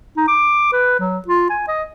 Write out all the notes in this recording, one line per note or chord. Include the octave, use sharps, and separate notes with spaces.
D#4
D6
B4
F#3
F4
G#5
D#5